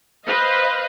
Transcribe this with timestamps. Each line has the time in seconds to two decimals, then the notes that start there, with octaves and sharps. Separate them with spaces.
0.25 B4 C5 D#5 F5